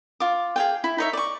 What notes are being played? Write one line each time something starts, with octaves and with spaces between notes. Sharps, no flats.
F4 D6
G#4 F5 G5
E4
D#4 C#5 E5
D5 C#6